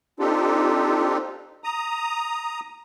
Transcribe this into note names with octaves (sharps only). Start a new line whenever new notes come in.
C4 D4 D#4 F4 G4 A4
A#5 D#6